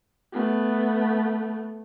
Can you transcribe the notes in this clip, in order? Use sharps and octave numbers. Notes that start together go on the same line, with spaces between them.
A3 B3